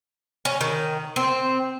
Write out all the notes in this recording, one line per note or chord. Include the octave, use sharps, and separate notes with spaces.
C#4
D#3
C4